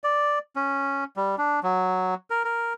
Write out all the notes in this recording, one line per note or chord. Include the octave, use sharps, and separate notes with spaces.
D5
C#4
G3
D4
F#3
A#4
A#4